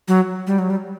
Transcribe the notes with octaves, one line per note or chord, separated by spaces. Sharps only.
F#3
G3
F#3
G3